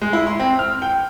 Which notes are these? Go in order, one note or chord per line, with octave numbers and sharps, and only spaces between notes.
G#3
E4
C6
C4
F6
G5